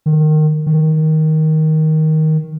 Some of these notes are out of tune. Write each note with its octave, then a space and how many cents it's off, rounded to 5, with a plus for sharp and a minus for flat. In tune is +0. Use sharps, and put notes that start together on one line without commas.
D#3 -15
D#3 +10